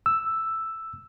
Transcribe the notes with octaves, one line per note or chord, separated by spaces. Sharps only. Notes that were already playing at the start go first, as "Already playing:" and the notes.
E6